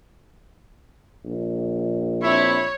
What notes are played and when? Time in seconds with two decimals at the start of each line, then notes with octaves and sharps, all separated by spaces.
1.25 A#1
2.22 C4 D4 E4 C#5